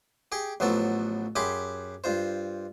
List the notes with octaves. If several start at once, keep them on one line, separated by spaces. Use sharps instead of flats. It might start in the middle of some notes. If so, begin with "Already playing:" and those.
G4 G#4 G5
A1 F3 F#3 B3 A4
F#2 G4 G#4 B5 C6 D6
G2 F4 C5